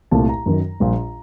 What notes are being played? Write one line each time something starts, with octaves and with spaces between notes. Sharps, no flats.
C2 A#2 A3 A5
A#5
F#2 D#3 F#3
A#1 A#2 G3